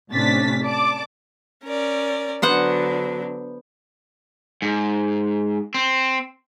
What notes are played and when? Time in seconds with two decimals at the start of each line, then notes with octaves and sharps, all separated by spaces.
0.11 A2 C3 C#4 D4 A6 B6
0.62 D5 A5 D6
1.64 C#4 A#4 D5
2.42 D3 F#3 B3 D4 C5 F#5
4.62 G#2
5.74 C4